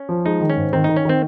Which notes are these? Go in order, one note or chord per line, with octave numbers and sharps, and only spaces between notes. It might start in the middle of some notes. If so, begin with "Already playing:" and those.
Already playing: C#4
F3
G#3 D#4
D#3
C#4
G#2
D#3 C4
D#3 D#4
C#4
D#3 C4